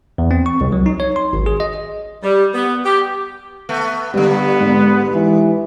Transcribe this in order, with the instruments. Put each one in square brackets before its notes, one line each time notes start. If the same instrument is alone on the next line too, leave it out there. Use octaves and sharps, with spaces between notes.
[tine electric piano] E2
C4
C#6
C2
F#3
D#4
C#5
C6
G#1
G#4
D#5
[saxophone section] G3
B3
G4
[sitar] A3 B3
[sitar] G2 D3 [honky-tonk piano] G3 [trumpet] B3
[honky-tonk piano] G#2
[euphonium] E3